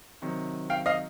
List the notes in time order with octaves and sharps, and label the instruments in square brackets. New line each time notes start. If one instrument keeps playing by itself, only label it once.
[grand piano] C3 D#3 F#3
F5 G5
D#5 F5